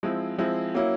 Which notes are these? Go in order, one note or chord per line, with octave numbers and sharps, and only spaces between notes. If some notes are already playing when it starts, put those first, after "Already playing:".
F3 G#3 C4 E4
F3 G#3 C4 E4
F#3 A#3 C#4 E4